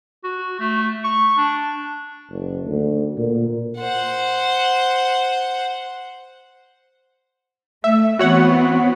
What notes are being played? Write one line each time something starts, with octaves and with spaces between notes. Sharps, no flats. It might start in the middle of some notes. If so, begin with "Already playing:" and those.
F#4
A3
C#6
D4
F#1
D2
A#2
C5 F#5
A3 E5
E3 B3 C4 F#4 C#5 F#5